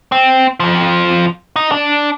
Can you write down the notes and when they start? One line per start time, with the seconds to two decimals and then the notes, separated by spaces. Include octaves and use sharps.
0.12 C4
0.60 F2 F3
1.56 D#4
1.71 D4